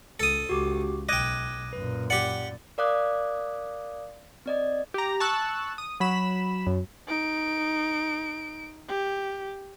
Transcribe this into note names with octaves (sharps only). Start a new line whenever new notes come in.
C#2 A4 D#6
C#2 F#4 G4 D6
B1 D#5 G5 D6 F#6 G#6
F#2 A#2 B4
G4 D5 F#5
A#4 D5 F5 D6 D#6 F#6
C4 D5 D#5
G4 A#5
A5 C#6 E6 F#6
D#6
F#3 B5 E7
F#2
D#4 D7
G4